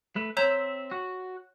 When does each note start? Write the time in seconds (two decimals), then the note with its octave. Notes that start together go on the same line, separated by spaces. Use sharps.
0.16 A3 B4
0.37 C4 C#5 E5 A#5 G6
0.91 F#4